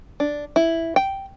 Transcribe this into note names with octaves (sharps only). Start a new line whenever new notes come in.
D4
E4
G5